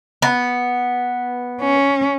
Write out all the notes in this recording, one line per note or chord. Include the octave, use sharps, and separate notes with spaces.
B3
C#4